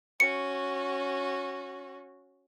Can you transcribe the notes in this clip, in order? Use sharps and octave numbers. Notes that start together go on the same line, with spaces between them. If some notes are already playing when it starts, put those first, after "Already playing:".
C#4 F#4 C#7